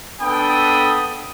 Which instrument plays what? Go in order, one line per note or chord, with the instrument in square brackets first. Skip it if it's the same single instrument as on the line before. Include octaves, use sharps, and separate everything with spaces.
[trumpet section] B3 D4 A4 G5 B5 D#6